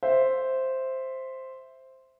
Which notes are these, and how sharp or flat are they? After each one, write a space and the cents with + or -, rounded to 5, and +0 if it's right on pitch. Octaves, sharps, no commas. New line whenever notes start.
C5 +0 E5 +0